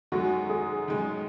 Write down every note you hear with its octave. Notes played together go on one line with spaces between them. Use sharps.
F#2 D#3 G#3 F#4
G#4
F#2 D#3 G#3